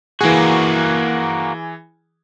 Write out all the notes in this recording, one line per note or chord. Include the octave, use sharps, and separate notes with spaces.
E3 A#3 F#4 G#4